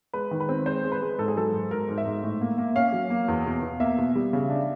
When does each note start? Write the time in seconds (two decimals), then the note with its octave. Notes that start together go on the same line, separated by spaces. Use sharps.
0.13 G#3 B4
0.31 D#3
0.40 B4
0.49 C4
0.66 G#3 C5
0.84 G#3
0.92 B4
1.02 G#3
1.18 G#2 A4
1.28 G#4
1.36 F#3 A4
1.54 G#2
1.71 G#2 A#4
1.89 G#2
1.98 E5
2.06 G#2
2.23 A2
2.41 A#3
2.58 A#3
2.75 C#4 F5
2.93 F#3
3.10 A#3
3.28 E2
3.46 B2
3.63 B2
3.80 A#3 E5
3.98 B2
4.15 G3
4.33 C#3
4.50 D4